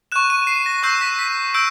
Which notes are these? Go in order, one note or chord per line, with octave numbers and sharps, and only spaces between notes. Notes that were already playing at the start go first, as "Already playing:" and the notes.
C#6 F#6 E7
D#7
C7
A#6
C#6 E6 G6 C7
B6
B6
E6 G6 D7